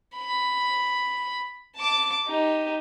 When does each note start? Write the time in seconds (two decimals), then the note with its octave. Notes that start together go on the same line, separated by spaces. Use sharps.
0.16 B5
1.77 A5 D6
2.27 D#4 G4